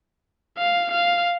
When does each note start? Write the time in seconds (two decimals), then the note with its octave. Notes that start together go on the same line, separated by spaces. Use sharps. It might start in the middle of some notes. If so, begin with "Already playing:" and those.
0.58 F5
0.92 F5